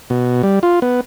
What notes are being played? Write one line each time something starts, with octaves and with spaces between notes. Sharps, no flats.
B2
G3
F4
B3